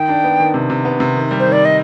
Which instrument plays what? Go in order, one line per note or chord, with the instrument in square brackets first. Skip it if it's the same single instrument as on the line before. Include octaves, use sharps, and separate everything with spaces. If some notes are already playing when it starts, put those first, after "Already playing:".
Already playing: [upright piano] D#3 [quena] G5
[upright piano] D4
B3
D#3
C3
C3
B3
C3
D#3
G3
[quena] C5
[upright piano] D#3
[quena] D5
D#5